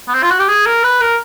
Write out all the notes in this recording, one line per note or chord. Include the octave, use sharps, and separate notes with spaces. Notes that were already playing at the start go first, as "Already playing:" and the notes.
B3
C4
F4
F#4
G4
G#4
A#4
B4
A#4